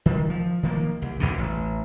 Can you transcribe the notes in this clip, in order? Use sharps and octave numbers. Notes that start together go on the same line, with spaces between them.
D#3
F3
D#3 F3 A#3
C2
G#1 C#2 B2 D3
A1